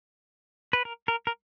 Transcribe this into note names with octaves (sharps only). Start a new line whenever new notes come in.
B4
A#4
A#4
A#4